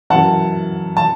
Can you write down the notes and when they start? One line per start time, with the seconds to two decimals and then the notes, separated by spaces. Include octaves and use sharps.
0.10 F#2 E3 F#5 A5
0.97 A5